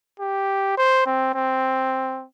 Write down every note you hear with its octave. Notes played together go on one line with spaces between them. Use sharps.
G4
C5
C4
C4